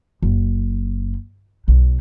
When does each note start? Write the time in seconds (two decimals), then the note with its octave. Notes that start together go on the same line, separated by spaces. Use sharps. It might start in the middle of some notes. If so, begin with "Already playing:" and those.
0.23 F#1
1.68 B1